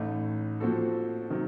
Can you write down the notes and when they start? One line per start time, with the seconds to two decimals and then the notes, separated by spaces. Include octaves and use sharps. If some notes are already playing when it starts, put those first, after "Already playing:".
Already playing: A1 A2 A3 D#4
0.60 A#2 F3 C4 F#4 A4
1.30 C3 D#3 F#3